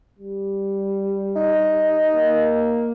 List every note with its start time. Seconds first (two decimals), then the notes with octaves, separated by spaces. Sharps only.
0.19 G3
1.36 D#4
2.15 A#3